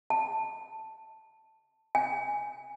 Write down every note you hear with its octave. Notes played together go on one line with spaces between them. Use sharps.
A5
G#5